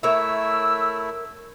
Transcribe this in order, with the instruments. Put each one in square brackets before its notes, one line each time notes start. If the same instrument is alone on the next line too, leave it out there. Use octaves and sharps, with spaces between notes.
[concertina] A3 E4 [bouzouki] A#4 C#5 E5 [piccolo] E6